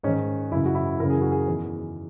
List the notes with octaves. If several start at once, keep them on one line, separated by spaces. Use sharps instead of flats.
G#2 D#3 C#4
F#2 C#3 E3 E4
F#4
E4
F#2 C#3 E3 A#4
G#4
F#4
G#4
E2 D#3